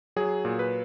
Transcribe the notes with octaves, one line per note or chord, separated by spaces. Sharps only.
F#3 G#4
A#2
B4